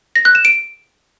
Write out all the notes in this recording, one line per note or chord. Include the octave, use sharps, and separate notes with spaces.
A#6
F#6
E7
D7